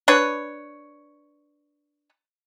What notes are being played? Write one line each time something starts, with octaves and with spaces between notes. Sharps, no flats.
D4 B4 C#5